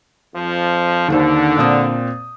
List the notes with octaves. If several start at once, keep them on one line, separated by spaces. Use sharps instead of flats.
F2 F3
D#2 D3 D#3 C5
A#2 C4 D#6